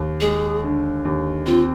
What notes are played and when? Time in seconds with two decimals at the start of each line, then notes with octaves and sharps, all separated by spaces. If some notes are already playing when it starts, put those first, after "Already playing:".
Already playing: D#2
0.21 G#3 G#4
0.63 D3
1.05 D#2
1.46 C4 F4